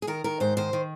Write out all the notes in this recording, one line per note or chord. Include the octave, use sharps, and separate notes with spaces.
G#4
D#3 A#4
D#3 A#4
G#2 C5
D#3 C5
D#3